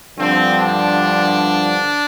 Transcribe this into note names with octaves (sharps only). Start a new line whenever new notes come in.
G2 D3 F3 C4
D4